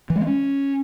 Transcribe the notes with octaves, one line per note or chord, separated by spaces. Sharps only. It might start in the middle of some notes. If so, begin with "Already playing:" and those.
E3
G#3
B3
C#4